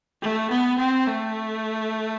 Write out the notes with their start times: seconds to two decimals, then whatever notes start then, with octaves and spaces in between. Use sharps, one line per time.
0.22 A3
0.50 B3
0.78 C4
1.07 A3